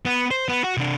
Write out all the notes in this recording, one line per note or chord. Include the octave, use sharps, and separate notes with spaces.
B3
C5
B3
F#4
C3 D4